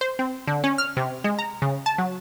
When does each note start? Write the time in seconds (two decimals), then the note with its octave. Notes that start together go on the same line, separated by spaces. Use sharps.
0.01 C5
0.19 C4
0.47 D3
0.64 C#4
0.78 F6
0.97 C3
1.24 G#3
1.39 A#5
1.62 C#3
1.86 A5
1.98 F#3